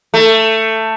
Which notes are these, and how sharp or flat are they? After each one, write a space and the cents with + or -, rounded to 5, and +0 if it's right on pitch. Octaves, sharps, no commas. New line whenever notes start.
A3 +15